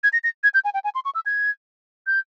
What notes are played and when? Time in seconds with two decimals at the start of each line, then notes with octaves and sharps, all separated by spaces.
0.04 G#6
0.13 A#6
0.24 A#6
0.44 G#6
0.54 G6
0.65 G#5
0.74 G5
0.84 G#5
0.95 C6
1.05 C#6
1.15 E6
1.26 G#6
2.07 G6